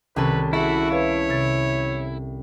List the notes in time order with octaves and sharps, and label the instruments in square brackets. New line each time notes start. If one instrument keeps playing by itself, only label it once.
[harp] C2 C#4 A4 [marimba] D#3 [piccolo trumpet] B4
[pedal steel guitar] E4 [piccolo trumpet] F#4 [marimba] G#4 [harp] A4 E5
[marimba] B4 F5 [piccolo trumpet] C#5
[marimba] C3 A6